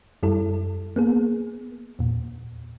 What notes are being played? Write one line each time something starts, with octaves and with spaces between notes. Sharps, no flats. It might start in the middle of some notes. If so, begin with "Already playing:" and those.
F#2 G3 E4 A4
A#3 B3 G#4
E2 A#2